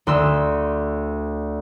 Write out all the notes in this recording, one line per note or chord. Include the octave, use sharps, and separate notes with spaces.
D2 C6 E6